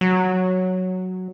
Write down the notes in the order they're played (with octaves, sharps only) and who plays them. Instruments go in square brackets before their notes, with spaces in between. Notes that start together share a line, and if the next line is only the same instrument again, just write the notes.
[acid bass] F#3